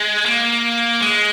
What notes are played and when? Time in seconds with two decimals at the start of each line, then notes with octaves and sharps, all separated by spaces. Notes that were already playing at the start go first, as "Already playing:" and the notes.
Already playing: G#3
0.25 A#3
1.01 G#3